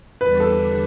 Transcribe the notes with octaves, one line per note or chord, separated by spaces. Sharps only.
E2 D3 G3 D4 B4
A4